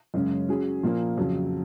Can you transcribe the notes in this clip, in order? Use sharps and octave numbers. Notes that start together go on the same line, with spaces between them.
F#2 C#3 G#3 C#4
F#3 C#4 G#4
A#2 F3 A#3
F2 C#3 F#3